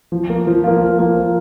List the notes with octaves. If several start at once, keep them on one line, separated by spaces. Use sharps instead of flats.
F3
A#3 F4
F3
A#3 F4
F3
A#3 F4
F3